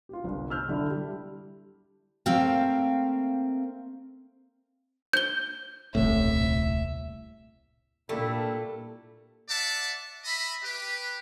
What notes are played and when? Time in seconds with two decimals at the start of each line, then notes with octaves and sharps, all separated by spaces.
0.09 F4 G4
0.24 G1 C2
0.50 E6 F6 G6
0.68 D3 G3 D4 E4
0.91 G3
2.26 A3 A#3 C4 E5 F5 G5
5.13 G6 G7
5.95 D#1 C2 A2 E5
8.09 A#2 G3 A3 A#3 D4 E4 A4
9.49 D5 E5 F#5 A5
10.24 D#5 E5 B5
10.63 G4 B4